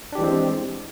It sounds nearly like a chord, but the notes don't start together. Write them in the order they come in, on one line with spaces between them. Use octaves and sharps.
D4 G4 E3 G#3 C4